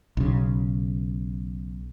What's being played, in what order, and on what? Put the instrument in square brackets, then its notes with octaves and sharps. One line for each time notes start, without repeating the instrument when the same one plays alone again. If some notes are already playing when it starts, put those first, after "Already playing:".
[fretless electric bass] B1 C#3